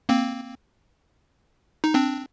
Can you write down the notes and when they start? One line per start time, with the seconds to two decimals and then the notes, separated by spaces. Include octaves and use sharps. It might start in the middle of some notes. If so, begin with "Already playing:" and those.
0.09 A#3 C4
1.84 D#4
1.94 C4 D4